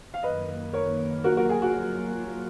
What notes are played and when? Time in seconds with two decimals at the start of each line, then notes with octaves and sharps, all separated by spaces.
0.14 F5
0.23 F#2 D#3 A#3 B4 D#5
0.73 A#4 C#5
1.24 F#3 A#3 F4 F#4 A#4
1.37 F#4 A#4
1.49 G#4
1.62 F#4